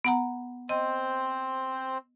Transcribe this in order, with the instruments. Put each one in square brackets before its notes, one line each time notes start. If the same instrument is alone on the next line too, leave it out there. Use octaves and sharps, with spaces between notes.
[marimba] B3 F#5 A#5
[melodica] C4 C5 [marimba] D#5